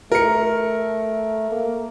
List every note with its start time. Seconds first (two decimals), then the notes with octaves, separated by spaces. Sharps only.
0.12 A3 A#4 C#7
1.52 A#3